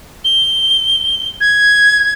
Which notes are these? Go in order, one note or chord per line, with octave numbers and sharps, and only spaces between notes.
G7
G#6